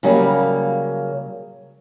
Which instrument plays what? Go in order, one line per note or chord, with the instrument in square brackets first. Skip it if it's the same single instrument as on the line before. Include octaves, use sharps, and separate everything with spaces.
[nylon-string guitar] C#3 F#3 G3 A#3